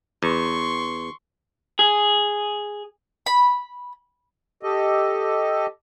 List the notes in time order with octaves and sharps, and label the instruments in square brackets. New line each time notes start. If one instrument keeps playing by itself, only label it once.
[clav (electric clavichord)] E2 [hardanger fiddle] C6 C#6
[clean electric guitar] G#4
[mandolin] B5
[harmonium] G4 A4 D#5